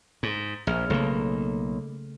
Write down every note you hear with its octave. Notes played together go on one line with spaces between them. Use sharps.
G#2
A#1 G#4 F6
B1 C#3 A3 A#3